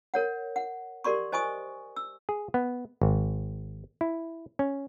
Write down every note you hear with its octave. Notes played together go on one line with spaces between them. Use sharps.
A#4 C#5 F#5
F#5
G4 A#4 D5 C6 C#6
C5 D#5 G#5 C#6 D#6
E6
G#4
B3
G#1
E4
C#4